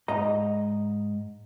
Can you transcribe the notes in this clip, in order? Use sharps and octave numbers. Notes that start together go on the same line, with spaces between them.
G#2 D#5 A#5